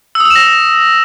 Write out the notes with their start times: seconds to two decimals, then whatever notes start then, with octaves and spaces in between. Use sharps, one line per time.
0.15 E6
0.20 D#6
0.25 E6
0.30 E7
0.36 A#6